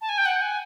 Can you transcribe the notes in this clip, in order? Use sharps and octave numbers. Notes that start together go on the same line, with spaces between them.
A5
G#5
G5
F#5
G#5